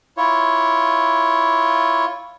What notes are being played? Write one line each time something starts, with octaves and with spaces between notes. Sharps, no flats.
E4 F4 C#5